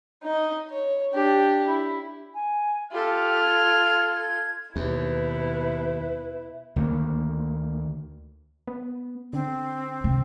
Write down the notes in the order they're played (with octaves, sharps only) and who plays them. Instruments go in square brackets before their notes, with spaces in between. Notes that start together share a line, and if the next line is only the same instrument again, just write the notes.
[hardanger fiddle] D#4 D#5
C#5
D4 G4
E4
[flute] G#5
[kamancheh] F4 A4 [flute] G4 [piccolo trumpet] F6
[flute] G#6
G#6
[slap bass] D#2 [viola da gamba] B2 [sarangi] E4 [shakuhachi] B4
[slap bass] D2 D#3 G3 A#3
[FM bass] B3
[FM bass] D3 [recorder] C4
[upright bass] C3